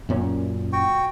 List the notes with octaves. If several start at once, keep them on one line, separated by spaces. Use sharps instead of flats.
F#2 A#2 C#4
F#4 G5 C#6